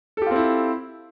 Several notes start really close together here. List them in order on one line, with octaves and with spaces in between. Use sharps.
A4 G4 F4 C4 E4